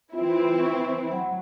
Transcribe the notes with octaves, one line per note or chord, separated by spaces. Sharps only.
E3 C4 E4 F4
C#6
F#3 F#5 B5